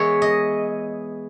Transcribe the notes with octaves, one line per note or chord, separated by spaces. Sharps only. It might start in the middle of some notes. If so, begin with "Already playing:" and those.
Already playing: E3 G#3 B3 C#5
D#5